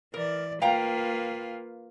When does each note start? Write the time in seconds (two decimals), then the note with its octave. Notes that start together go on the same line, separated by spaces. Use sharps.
0.14 E3 A#4 D5
0.62 A#3 F4 B4 F5 G5 A#5